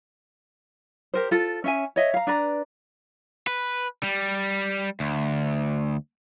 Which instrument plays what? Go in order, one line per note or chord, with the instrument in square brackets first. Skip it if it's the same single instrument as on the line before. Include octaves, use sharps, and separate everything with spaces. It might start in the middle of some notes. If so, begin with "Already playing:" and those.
[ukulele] G4 A#4 C5
F4 A4
C#4 E5 G#5
C#5 D#5 E5
F5 A#5
D4 B4 D5 A#5
[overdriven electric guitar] B4
G3
D2